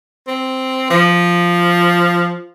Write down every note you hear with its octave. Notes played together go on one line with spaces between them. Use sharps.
C4
F3